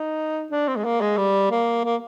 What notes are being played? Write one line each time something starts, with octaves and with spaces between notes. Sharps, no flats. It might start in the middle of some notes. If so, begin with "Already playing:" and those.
Already playing: D#4
D4
C4
G#3
A#3
G#3
G3
A#3
A#3